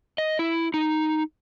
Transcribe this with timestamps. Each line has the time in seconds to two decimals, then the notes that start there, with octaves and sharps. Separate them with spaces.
0.18 D#5
0.39 E4
0.74 D#4